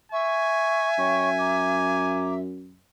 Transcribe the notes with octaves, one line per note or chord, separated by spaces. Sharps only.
E5 G#5 C#6
F#2 C#5 G5 C#6
A#5 D6